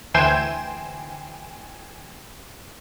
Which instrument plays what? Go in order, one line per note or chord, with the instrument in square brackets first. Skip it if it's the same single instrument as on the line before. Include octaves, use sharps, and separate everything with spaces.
[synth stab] D2 E3 C5 G5 G#5 E7